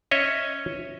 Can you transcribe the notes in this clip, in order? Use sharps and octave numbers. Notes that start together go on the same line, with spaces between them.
C#4 C#5 D#5 E5